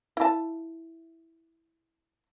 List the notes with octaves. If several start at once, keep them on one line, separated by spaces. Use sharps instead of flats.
E4 A5